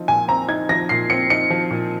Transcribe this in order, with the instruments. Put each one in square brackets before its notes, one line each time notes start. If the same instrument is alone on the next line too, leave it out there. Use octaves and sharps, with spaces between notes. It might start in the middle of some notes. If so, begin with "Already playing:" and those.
Already playing: [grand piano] F3 C4 D#4
[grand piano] A#2 [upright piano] G#5
[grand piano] C4 [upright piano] A#5
[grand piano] D#4 [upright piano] G#6
[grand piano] F3 [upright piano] A#6
[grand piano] A#2 [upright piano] C7
[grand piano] C4 [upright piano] C#7
[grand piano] D#4 [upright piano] C#7
[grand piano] F3
A#2